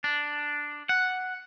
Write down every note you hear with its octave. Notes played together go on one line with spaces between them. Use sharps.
D4
F#5